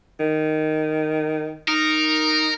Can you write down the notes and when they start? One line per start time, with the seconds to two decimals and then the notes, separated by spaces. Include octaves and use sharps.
0.20 D#3
1.68 D#4 A#4